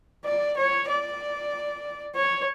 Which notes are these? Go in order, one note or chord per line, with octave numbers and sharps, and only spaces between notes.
D5
C#5
D5
C#5